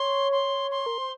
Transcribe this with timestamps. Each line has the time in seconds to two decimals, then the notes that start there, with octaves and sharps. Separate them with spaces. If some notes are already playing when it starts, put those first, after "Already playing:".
Already playing: C#5 C6
0.31 C6
0.71 C6
0.86 A#4
0.98 C5